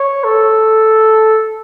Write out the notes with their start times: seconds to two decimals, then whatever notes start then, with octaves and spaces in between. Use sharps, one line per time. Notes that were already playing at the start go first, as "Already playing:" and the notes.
Already playing: C#5
0.24 A4